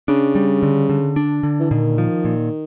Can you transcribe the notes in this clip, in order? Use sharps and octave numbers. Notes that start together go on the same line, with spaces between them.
C#3 D4
G3
D3
D3
D4
D3
E3
A#2 D#3
F3
A#2